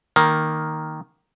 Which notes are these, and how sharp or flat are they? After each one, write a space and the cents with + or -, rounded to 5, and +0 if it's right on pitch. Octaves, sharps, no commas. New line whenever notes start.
D#3 +0 A#3 +0